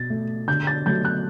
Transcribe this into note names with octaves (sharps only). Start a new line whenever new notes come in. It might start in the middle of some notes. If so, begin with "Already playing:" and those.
Already playing: B2 A6
A3
D3 G6
A6
F#3 A3 G6
F#6